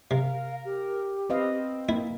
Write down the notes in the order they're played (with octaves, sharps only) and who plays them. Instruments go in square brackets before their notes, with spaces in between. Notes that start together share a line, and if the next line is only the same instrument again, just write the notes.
[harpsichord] C3 [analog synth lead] A#4 [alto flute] F5
[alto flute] G4
[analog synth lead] C4 [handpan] B4 D#5 F5
[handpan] A#3 [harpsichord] E4